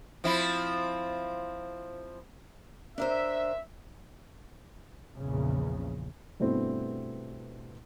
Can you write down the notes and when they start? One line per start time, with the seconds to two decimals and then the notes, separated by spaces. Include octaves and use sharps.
0.24 F3 C4 E4
2.98 D4 A#4 C5 E5
5.17 A#1 E2 C#3
6.40 G2 B2 A3 C4 E4